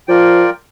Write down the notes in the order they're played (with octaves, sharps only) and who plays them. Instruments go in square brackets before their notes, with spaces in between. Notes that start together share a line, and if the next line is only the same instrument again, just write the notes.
[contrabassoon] F3 [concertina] F4 A#4 D5 G5